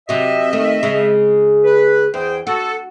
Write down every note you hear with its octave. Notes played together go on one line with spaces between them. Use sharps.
C3 F#3 D#5 E5
D#3 A3
C#3 G#3
B4
E2 G#4 C5 G5
F#4 A4